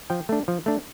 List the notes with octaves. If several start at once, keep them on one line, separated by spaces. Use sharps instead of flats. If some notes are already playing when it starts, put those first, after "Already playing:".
F3 G5
A3 D4
F3
A3 D4